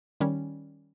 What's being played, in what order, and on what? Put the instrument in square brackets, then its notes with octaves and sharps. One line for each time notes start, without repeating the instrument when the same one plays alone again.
[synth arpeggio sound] D#3 G3 C#4